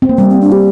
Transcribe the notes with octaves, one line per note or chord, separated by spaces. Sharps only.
C4
A#3
G3 C4
C4
D4
G4